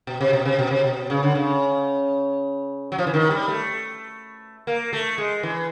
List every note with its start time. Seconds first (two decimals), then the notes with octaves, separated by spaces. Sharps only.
0.07 B2
0.21 C3
0.33 B2
0.45 C3
0.59 B2
0.71 C3
0.84 B2
1.10 C#3
1.23 D3
1.35 C#3
2.92 F#3
2.98 F3
3.07 E3
3.14 D#3
3.31 G3
3.48 A3
4.67 A#3
4.93 A3
5.18 G#3
5.43 E3